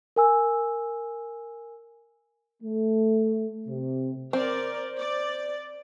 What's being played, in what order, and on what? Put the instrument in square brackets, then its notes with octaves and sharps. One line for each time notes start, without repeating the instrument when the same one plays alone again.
[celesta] A#4 G#5 E6
[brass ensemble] A3
C3
[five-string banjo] C4 [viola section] A#4 D5 [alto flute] C5
[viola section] D5